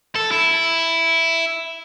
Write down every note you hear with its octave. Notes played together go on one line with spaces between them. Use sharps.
A4
E4